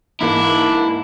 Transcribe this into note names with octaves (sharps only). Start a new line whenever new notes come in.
G#2 E3 A#3 D4 E4